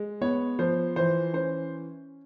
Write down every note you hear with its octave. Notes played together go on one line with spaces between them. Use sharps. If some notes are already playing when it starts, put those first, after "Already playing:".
Already playing: G#3
B3 C#5
F3 C5
E3 C5
C#4 C5